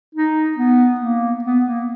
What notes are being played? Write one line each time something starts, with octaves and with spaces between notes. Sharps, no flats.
D#4
B3
A#3
B3
A#3